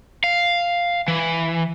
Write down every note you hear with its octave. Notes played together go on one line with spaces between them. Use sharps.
F5
E3